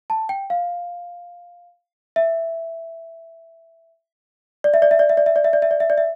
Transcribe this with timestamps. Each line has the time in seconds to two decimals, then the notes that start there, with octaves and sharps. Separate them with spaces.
0.10 A5
0.29 G5
0.50 F5
2.16 E5
4.64 D5
4.74 E5
4.82 D5
4.91 E5
4.99 D5
5.09 E5
5.17 D5
5.26 E5
5.36 D5
5.44 E5
5.53 D5
5.62 E5
5.71 D5
5.80 E5
5.90 D5
5.98 E5